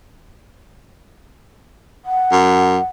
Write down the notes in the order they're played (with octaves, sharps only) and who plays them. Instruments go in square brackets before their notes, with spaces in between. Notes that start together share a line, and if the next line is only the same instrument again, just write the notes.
[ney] F#5
[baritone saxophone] F#2